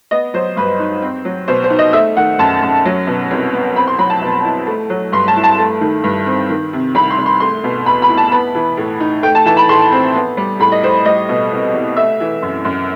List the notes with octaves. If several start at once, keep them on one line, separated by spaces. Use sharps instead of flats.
B3 D#5
F#3 C5
G2 B4
D#4
C4
F#3
B2 C5
C5
D#4
D#5
A3 E5
D#3 F#5
F#2 A5
F#2
F#3
B2
C2
B3
C4 B5
C6
F#3 B5
A5
B2
E4
A3
F#3
G2 C6
A5
E4
A5
A3
D#3
G2
C4
D#3
C3
C2 B5
C6
C2
C6
A3 C6
B2
E2 B5
B5
E4
A5
B3 B5
E3
A2
D#4
A3 G5
A5
E3 A5
B5
A2 C6
C4
B3
G3
A2 B5
D#5
A2 C5
G3 D#5
B2
C2
C2
A3 E5
E3
F#2
F#2